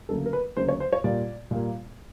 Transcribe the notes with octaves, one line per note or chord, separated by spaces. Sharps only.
D2 C#3 F#3 A#3 A4
A#4
B4
D2 C#3 F#3 A#3 C5
C#5
C5
C#5
A#2 G3 A#3 D5
A#2 G3 A#3